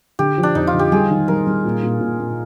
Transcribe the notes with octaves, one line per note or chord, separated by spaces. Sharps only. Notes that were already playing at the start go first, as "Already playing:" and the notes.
D3 G4
F3
D4
F2 D#4
F4
D3
G4
G3 G#4
D#3
G3 A#4
G3
A#2
A#2
A#2
A#2